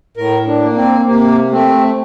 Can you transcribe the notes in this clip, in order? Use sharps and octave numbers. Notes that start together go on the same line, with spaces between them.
A2 A#4
D4
A#3
C4
C3 A#3
A3 C4